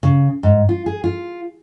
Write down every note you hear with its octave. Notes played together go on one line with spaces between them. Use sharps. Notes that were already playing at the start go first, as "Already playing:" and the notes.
C#3
G#2
F4
G#4
F4